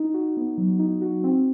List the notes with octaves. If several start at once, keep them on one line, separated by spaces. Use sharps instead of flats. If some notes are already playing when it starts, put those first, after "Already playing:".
Already playing: D#4
F#4
B3
F#3
D#4
F#4
C4